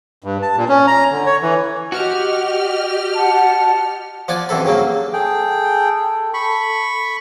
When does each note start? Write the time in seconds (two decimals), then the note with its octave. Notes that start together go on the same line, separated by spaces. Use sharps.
0.24 G2
0.42 A5
0.57 A#2
0.69 C#4
0.87 A#5
1.11 D3
1.26 C#5
1.42 E3
1.92 F#4 G4 D#5 F6
3.16 F#5 A5
4.28 F3 D5 F#5 G#5 D6
4.49 F#2 C3 E3 A4 B5
4.65 G2 C#3 F#3 A#3
5.13 G#4 A4 G5
6.34 A4 B5 C#6